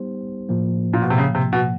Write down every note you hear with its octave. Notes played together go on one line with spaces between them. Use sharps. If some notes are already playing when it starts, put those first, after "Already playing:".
Already playing: G3 B3 D#4 G4 C5
A2 F3 A#3
A#2
B2
C3
C#3
C3
B2